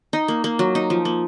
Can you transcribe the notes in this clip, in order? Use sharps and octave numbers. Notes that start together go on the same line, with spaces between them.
D#4
A#3
A#3
F#3
D#4
F3
A#3